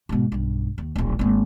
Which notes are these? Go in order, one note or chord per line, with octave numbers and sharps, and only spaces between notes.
G#2 B2
B1 G2
D#2
D1 A#1
G#1 A#3